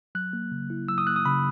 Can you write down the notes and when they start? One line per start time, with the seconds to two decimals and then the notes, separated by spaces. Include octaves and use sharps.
0.15 F#3 F#6
0.33 A#3
0.52 C#3
0.70 E4
0.88 F#3 E6
0.98 D#6
1.07 A#3 F#6
1.16 D#6
1.25 C#3 B5